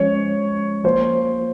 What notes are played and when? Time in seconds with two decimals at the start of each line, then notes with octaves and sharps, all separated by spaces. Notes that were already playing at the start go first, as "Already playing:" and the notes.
Already playing: F3 G#3 C#4 C#5
0.84 F3 A#3 F4 C5